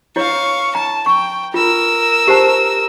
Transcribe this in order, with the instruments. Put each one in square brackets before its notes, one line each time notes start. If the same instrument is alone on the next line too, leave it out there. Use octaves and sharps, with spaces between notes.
[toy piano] E4 C#5 [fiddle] F5 C#6
[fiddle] A5 [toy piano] A#5
[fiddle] G5 [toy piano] C#6
[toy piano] F4 [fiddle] A#4 E6
[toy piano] G4 C5 A5